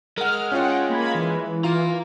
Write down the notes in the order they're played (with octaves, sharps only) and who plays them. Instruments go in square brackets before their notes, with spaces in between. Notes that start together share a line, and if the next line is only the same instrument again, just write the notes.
[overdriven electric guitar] G#3 [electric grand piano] A#4 F#5 [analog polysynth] F6
[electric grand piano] C#4 F4 C#5 [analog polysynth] F#5 G5
[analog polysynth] A#3 B5 G#6
E3
[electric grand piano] F4 [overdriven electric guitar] F5 A#5